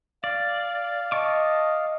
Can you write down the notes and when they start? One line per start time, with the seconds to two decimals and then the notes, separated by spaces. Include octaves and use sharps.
0.24 D5 F5
1.12 D#5 A5 C#6 D6